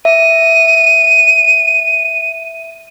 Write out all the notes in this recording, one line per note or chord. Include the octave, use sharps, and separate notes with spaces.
E5 D#7